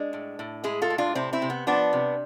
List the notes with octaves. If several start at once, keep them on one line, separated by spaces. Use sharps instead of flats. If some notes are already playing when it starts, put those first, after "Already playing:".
Already playing: G#3 D4
A2
A2
G#3 E4 G#4
F4 A4
A2
D4 F4
C3 C4 E4
C4 E4
C3
B3
F3 B3 D4
C3